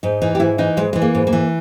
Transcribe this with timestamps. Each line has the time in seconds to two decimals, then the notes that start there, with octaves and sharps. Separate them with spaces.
0.03 G#2 D#4
0.22 E3 D#4
0.35 G4
0.40 G#2 E4
0.58 E3 D#4
0.77 G#2 G#3
0.93 E3 G#3
1.02 A#3
1.15 G#2
1.27 A#3
1.33 E3